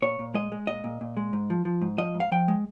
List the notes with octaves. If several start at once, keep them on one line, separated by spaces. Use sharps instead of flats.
A#2 C#5
A#2
G#3 D#5
G#3
A#2 D#5
A#2
A#2
G#3
G#2
F3
F3
G#2
F3 D#5
G#2
F5
F3 G5
G#3